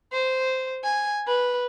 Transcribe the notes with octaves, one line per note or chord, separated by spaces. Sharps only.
C5
G#5
B4